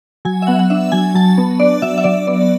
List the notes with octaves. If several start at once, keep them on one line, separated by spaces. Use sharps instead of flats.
F#3 G#5
E5
B3 F#5
F#5
D4 E5
F#3 G#5
F#3 A5
B3
D4 D5
F#3 E5
E5
F#3 D5
B3 D5